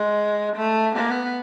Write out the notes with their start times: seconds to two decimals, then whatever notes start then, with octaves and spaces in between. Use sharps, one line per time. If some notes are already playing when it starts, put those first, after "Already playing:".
Already playing: G#3
0.57 A3
0.96 B3